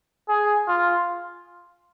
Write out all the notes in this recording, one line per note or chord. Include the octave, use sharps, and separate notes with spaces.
G#4
F4